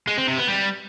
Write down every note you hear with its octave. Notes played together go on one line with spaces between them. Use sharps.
G#3
C4
C3
B3
G3